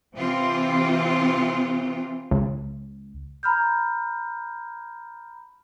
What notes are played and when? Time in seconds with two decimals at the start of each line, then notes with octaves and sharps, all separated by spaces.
0.15 C3 E3 C4 F4
2.31 C#2
3.43 A#5 B5 F6 G6